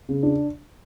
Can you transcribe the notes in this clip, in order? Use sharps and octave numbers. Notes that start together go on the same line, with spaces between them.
C#3
D4